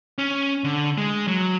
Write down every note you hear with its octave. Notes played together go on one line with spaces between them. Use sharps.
C#4
D3
G#3
F#3